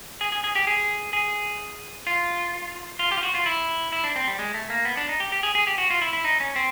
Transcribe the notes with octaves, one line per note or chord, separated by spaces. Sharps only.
G#4
G#4
G#4
G4
G#4
G#4
F4
F4
G4
F4
F#4
F4
E4
E4
D4
C4
G3
G#3
A3
A#3
B3
D4
D#4
G4
G4
G#4
G#4
G4
F#4
F4
E4
E4
D#4
C#4
C4